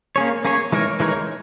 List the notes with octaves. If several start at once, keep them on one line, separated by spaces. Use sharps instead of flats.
A#3 C#4 G#4 C#5
A#3 C#4 G#4 C#5
E3 G#3 D#4 A#4 C#5
E3 G#3 D#4 A#4 C#5